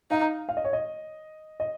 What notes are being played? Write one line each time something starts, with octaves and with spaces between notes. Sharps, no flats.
D#4 F5
F5
D#5
C#5
D#5
D#5